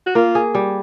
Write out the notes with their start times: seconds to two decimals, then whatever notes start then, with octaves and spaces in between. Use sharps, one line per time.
0.06 F#4
0.15 A#3 F4
0.35 G#4
0.55 G3